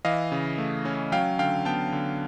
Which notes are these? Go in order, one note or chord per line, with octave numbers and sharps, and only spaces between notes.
E3 D#5 F5
C#3
A3
C#4
F#3 F5 G5
D3 F5 G5
B3 G5 A5
D3